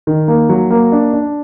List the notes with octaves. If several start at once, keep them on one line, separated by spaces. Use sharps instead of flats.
D#3
A#3
F#3
A#3
D4
D4